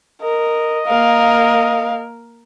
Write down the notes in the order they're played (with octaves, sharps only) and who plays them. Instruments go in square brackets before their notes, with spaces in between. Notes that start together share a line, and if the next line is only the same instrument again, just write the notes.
[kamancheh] A#4 [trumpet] D#5
[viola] A#3 A#4 [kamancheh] F5